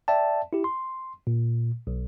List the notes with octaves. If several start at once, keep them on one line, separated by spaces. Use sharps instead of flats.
D5 E5 G5 A5
E4 G4
C6
A#2
B1